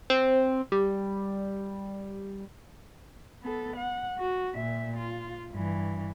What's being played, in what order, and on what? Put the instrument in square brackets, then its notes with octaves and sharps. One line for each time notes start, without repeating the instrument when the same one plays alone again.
[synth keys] C4
G3
[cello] B3 A4
F#5
F#4
A#2 E5
F4
G2 E3